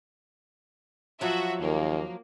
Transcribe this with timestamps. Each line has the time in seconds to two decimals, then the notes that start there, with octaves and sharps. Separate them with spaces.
1.21 F3 F#3 F#4 E5
1.61 D#2 A#3